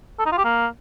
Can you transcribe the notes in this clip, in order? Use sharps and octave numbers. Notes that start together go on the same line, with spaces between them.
A4
D#4
F4
G4
A#3